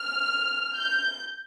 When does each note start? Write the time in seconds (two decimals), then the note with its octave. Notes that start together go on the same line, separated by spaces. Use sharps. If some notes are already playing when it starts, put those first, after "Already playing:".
Already playing: F6
0.77 G6